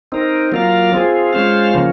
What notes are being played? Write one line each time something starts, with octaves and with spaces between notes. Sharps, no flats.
C4 D#4 A#4
F#3 A#3 F4 A#4 F5
C4 F4 G#4
G#3 C#4 F4 C5 F5
C#3 F3 A#3 C#4